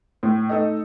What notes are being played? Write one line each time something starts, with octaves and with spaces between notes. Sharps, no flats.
A2
A3 D#4 A4 D#5